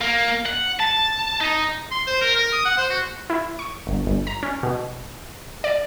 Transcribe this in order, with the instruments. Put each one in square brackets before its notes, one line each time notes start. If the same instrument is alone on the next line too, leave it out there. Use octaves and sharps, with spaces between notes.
[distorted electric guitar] A#3
F#5
A5
D#4
[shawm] C6
C5
A#4
A#4
D#6
F#5
C5
F#4
[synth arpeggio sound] E4
C#6
G1
G1
A#5
C#4
B2
D5